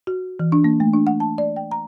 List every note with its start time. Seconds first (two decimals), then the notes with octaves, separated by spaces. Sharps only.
0.07 F#4
0.39 E3
0.52 D4
0.64 A#3
0.80 A3
0.93 D4
1.07 F#5
1.20 A5
1.38 D5
1.56 G5
1.71 A#5